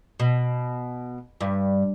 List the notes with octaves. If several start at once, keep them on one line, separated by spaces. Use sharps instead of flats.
B2
G2